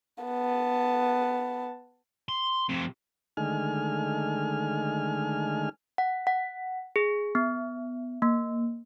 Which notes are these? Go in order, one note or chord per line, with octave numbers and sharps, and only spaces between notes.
B3 A5
C6
F2 C3
D3 D#3 G#3 A3 G#5 F6
F#5
F#5
G#4
B3
A#3